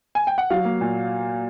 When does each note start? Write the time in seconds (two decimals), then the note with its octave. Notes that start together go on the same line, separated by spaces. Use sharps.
0.15 G#5
0.27 G5
0.38 F#5
0.50 F#3 F5
0.65 A#3
0.81 A#2